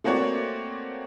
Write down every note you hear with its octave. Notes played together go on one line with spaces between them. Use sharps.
A3 A#3 C4 F#4 C#5 D5